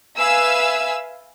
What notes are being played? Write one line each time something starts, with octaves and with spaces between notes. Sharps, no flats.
B4 E5 F5 G#5 E6